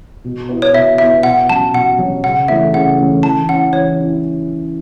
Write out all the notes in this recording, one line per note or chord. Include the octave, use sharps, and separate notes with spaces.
B2
B3 E4
C#5
B2 E5
B3 E4 E5
B2 F#5
F#3 C#4 A5
B2 F#5
F#3 C#4
C#3 F#5
E3 A3 C#4 E5
C#3 F#5
E3 A3 C#4
E3 A5
C#4 E4 F#5
E3 C#5
C#4 E4